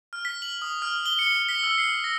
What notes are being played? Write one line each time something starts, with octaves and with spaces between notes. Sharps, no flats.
F6
B6
F#7
D#6
F6
G7
C#7
B6
E6
C7
A#6